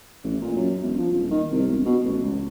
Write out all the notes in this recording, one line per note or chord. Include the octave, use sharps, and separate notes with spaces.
A1
A#2
F#2
E1
F3
D#1
D#3
C2
E1
B2
A1
C#2